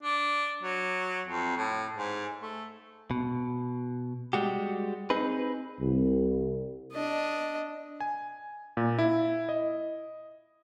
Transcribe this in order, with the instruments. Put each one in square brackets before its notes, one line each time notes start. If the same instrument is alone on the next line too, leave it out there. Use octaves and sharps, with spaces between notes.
[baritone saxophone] D4
F#3
F2
A2
G#2
A3
[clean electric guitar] B2
G3 G#3 F#4 G4
C4 D#4 G#4 B4
[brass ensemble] C2
[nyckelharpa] D4 D#5
[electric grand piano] G#5
A#2
E4
D#5